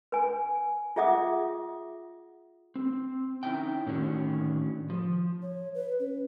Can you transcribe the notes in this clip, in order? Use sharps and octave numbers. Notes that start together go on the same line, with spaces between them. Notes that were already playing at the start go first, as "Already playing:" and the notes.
B4 G#5
F4 G#4 E5 F#5 D6 D#6
C4
C#4 D#4 E4 G5
A2 D3 D#3 C#4 D4 F#4
F3
C#5
B4
C#4